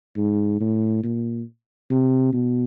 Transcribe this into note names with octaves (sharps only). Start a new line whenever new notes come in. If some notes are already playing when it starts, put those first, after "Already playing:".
G#2
A2
A#2
C3
B2